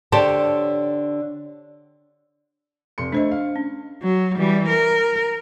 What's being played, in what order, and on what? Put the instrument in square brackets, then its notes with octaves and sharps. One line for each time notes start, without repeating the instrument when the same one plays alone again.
[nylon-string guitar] D3 G4 C5 C#5 A5
[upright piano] F1 C6 C#7
[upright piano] A3 [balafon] D4 C5 D#5
[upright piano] F5
[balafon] C#4
[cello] F#3
E3 G3
A#4